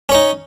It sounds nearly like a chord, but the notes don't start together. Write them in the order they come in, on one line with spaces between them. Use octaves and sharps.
C#4 C#5 D#4